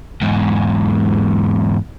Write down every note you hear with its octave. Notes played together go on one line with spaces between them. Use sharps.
E2 G#2